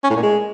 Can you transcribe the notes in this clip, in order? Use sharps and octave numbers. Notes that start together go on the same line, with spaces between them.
C#4
A2
A#2
G#3